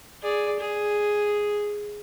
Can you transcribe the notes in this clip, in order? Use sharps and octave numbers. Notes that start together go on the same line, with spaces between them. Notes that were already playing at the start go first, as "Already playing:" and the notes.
G#4 D5
G#4